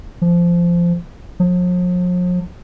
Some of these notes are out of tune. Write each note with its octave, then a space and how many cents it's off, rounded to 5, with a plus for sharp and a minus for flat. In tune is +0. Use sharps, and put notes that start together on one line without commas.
F3 -15
F3 +45